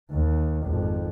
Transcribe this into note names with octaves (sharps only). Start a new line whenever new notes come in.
D#2
G#1 F2